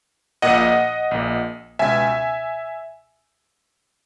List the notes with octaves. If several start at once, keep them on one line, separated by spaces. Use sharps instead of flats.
A#1 A#2 D#5 F#5
A#1 A#2
C#2 B2 E5 G#5